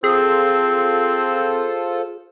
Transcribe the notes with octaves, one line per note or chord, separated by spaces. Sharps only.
C4 F4 G#4 A4 C5